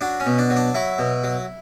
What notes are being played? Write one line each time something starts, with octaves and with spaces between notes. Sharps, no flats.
F#3 D4
C#4
B2
D4
F#3
D4
F#3 E4
B2
F#3